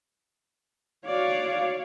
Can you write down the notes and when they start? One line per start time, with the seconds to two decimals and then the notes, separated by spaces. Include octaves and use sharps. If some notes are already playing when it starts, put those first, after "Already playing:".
1.06 F#4 C#5 D5 F5